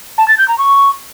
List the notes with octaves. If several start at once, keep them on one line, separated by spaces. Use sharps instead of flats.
A5
A6
G6
A#5
C#6